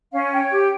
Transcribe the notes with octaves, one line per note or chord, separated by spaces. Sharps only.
C#4 F5
C#5 G5
G4